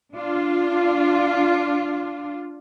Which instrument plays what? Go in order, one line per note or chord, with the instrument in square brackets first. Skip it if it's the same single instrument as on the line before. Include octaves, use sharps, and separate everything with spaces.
[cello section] D4 F4